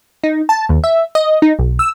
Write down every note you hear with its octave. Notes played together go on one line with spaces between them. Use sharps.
D#4
A5
D#2
E5
D#5
D#4
B1
E6